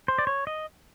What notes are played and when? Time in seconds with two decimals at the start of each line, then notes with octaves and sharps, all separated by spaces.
0.08 C5
0.18 D5
0.27 C#5
0.47 D#5